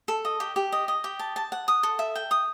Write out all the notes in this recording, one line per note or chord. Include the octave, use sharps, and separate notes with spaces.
A4
D#5
G4
G4
D#5
D#5
G4
A5
A5
F#5
D#6
A4
E5
G5
D#6